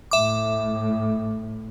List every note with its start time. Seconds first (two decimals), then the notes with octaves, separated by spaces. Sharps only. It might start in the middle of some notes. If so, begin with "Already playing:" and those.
0.11 A2 E5 D6